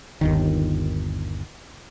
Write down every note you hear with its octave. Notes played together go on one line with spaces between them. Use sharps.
G1 D#2 D#3